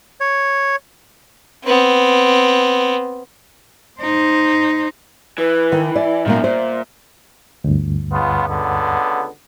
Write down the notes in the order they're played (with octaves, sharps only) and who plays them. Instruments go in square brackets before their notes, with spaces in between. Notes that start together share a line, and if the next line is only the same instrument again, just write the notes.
[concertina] C#5
[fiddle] B3 C4
[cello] D#4 C5
[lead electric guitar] E3 [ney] B4
[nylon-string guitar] D#3
[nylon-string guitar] D5 [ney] E5
[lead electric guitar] F#2 D#3 [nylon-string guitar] A#2 A3 A#3
[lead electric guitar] A#2 [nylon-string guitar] C5
[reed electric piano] D2 G2
[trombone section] C#2 B3 F4
C#2 D3 B3